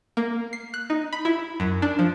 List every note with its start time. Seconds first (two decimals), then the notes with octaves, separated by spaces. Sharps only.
0.17 A#3
0.53 C7
0.74 F#6
0.90 D#4
1.13 B5
1.25 E4
1.60 F#2
1.82 D4
1.99 F3